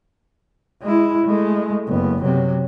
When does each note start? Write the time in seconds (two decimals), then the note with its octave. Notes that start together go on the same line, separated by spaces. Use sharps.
0.82 G#3 E4
1.26 G#3 A3
1.88 F#1 B3
2.23 C3 F#3